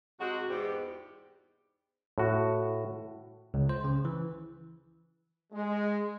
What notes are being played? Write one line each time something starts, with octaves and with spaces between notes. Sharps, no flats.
C3 G#3 F#4
E2 G#2 G4
A2 F#4
C#2
C5
C#3
E3
G#3